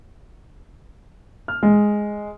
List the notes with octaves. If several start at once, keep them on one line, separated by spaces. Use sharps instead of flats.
F6
G#3